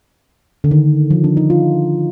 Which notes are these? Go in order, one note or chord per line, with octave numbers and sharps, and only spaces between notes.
D3
D#3
F3
D4
D#4
F4